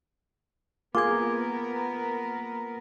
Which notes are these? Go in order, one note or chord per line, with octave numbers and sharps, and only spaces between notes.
A#3 B3 F4 G#4 A#4 D6 G#6